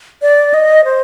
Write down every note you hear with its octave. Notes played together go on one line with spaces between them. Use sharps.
D5
D#5
C5